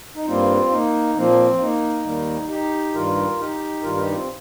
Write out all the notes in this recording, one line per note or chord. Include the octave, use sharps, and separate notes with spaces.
D#4
G2 G3 A#3 C4 F4
A#3 D#4
A#2 F3 A#3 C4
A#3 D#4
D#2 D#3 G3 A#3
D#4 G4
G2 D#3 G3 F4 A#4
D#4 G4
G2 D#3 G3 F4 A#4
D#4 G4
C4 F4